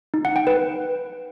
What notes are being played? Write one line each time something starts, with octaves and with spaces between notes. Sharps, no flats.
D#4
F#5
G5
B4